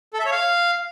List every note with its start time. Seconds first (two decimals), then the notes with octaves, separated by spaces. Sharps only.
0.14 A4
0.20 E5
0.26 C#5
0.31 F5